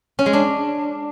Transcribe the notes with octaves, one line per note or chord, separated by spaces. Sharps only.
C#4
G#3
D4